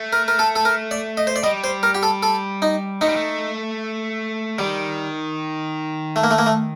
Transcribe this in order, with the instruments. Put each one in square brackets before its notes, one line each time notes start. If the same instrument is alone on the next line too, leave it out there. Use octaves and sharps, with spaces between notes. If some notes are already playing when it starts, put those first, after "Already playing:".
Already playing: [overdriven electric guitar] A3
[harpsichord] A#4
A#4
A4
A4
A#4
D5
D#5
C5
D5
[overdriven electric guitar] G3 [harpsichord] D#5
[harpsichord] C5
A#4
G4
A4
A4
D#4
[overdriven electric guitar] A3 [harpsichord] D#4
[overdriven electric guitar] G3
A3
[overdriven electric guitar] D#3 [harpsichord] G3
[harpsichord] A3
A#3
A3
A#3
A3